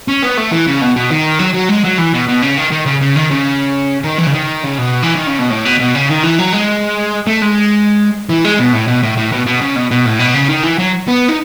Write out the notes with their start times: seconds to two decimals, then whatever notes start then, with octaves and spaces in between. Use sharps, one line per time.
0.08 C#4
0.23 B3
0.37 A3
0.52 E3
0.67 C#3
0.81 B2
0.96 B2
1.11 D#3
1.39 F#3
1.54 F#3
1.69 G#3
1.84 F#3
1.99 E3
2.14 B2
2.29 B2
2.42 C#3
2.57 D#3
2.72 D#3
2.86 C#3
3.01 C#3
3.16 D#3
3.31 C#3
4.04 D#3
4.18 E3
4.26 C#3
4.33 D#3
4.63 C#3
4.78 B2
5.03 E3
5.15 D#3
5.27 C#3
5.38 B2
5.50 A2
5.65 B2
5.79 B2
5.94 C#3
6.09 D#3
6.24 E3
6.39 F#3
6.53 G#3
7.27 A3
7.42 G#3
8.29 E3
8.45 G#3
8.59 B2
8.73 A2
8.87 B2
9.03 A2
9.17 A2
9.32 B2
9.46 B2
9.61 C#3
9.75 B2
9.91 B2
10.06 A2
10.19 B2
10.34 C#3
10.49 D#3
10.63 E3
10.78 F#3
11.08 B3
11.29 D#4